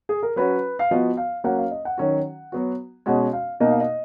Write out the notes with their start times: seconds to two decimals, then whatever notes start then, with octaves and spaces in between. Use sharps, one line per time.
0.09 G#4
0.23 A#4
0.36 F#3 C#4 F#4 B4
0.79 F5
0.91 F3 B3 F#4 D#5
1.17 F5
1.44 F#3 A#3 C#4 F#5
1.58 F5
1.71 D#5
1.85 F#5
1.98 D#3 F#3 C#4 F#4
2.52 F#3 B3 F#4
3.06 B2 G#3 C#4 F#4 F#5
3.33 F5
3.60 B2 A#3 D#4 D#5
3.71 F5
3.81 D#5